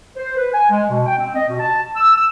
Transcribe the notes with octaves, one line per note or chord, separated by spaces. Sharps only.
C5
B4
G#5
G#3
B2
G5
C4
D#5
B2
A5
E6
E6